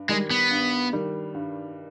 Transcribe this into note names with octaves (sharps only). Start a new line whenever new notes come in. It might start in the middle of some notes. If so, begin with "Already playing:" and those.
Already playing: G2
D#3 G3 G#3
B3
G2
D#3 G3
G2